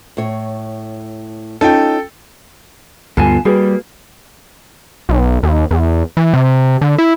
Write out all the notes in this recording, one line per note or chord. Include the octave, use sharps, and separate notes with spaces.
A2 C#5
C#4 D#4 F4 A4 G5
D2 G2 B3 F4 A4 G#5 A5
G3 A#3 F#4 G#4 B4
B1
D#2
E2
E3
C3
D3
E4